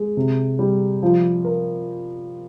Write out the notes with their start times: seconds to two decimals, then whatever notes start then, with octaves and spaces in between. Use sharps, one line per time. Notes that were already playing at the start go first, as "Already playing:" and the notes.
Already playing: G#3
0.17 C3
0.59 G3
1.03 F3
1.45 A#4